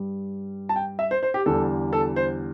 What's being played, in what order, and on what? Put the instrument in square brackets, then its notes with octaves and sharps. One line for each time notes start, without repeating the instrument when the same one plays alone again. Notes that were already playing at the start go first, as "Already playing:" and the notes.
Already playing: [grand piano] G2 G3
A5
G5
E5
C5
C5
G4
E2 D3 G3 A4
A4
C5